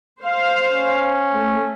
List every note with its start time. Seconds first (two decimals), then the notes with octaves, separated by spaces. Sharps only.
0.22 C5 F5
0.70 C#4
1.34 A3